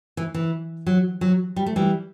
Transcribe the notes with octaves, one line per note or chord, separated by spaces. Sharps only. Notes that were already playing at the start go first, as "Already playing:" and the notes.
E3
E3
F#3
F#3
G3
A3
E3 G3